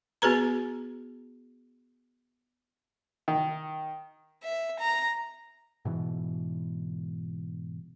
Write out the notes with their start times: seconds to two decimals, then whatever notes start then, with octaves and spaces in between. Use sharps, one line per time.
0.22 B3 F#4 G#4 B4 A#5
3.28 D#3
4.43 E5
4.79 A#5
5.85 G#2 B2 E3